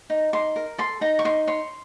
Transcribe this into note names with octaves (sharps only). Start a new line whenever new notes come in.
D#4
D#4 C6
A#4
A4 C6
D#4 A#5
C#6
D#4 C6
C#5 C6